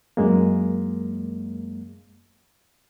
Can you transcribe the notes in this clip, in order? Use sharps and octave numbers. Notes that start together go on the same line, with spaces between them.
F#2 G#3 A#3